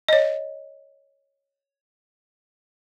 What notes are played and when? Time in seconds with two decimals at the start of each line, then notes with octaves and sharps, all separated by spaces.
0.08 C#5 D#5